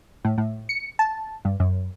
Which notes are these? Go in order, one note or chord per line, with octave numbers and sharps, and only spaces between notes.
A2
A2
C#7
A5
G2
F#2